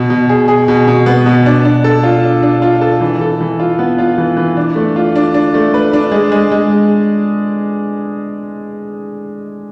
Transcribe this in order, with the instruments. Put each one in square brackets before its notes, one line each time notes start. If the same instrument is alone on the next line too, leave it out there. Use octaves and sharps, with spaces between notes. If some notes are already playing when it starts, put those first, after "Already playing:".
Already playing: [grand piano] B2
B2
G#4
G#4
B2
B2
B3
B2
D4
D4
A4
F4
D4
D4
F4
A4
E3
A4
E3
F4
B3
F4
E3
E3
D4
A3
F4
D4
D4
A3
B4
D4
G#3
G#3
G#3